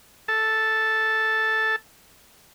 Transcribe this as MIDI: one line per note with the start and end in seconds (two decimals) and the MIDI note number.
0.28 1.76 69
0.28 1.76 81